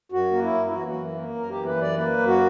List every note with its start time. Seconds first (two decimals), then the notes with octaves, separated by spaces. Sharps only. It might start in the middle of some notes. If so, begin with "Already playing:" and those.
0.12 F#2 F#4
0.32 A#3
0.42 E4
0.53 F#2
0.67 E4
0.73 E3 F#4
0.88 F#4
0.94 F#2
1.14 A#3
1.35 F#2 A#4
1.50 G4
1.55 E3
1.66 B4
1.76 F#2 D5
1.97 A#3 B4
2.18 F#2
2.27 F#4